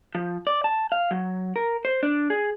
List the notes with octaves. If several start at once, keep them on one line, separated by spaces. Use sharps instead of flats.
F3
D5
A5
F5
F#3
A#4
C5
D4
G#4